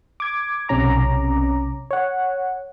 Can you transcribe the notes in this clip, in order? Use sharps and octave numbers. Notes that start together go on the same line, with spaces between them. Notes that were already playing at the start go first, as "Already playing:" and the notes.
D6 G#6
B1 C3 C#4 A#5 D6
C#5 F#5